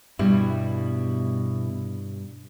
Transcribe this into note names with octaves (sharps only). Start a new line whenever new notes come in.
G2 B2 G3 E4